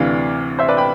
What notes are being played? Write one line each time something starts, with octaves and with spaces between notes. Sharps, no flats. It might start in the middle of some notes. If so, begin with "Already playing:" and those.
Already playing: D2 C3 E3 D5 F5
C5 E5
B4 D5
G5 B5